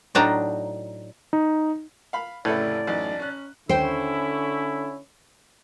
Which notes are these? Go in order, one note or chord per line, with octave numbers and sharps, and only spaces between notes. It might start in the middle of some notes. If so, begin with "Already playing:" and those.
A2 F#3 D4 D#4 A5 A#5
D#4
F5 B5
F1 A2 C#3 E4 A4 B4 D5
A1 F#2 D#4 A5
C#4 F#6
D#2 D3 C#4 E4 C5 G5